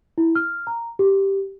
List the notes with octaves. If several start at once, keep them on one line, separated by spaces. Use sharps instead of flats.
E4
F6
A#5
G4